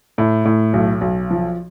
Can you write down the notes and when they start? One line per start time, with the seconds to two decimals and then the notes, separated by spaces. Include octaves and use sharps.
0.18 A2
0.45 A2
0.73 B1
1.01 B1
1.31 F3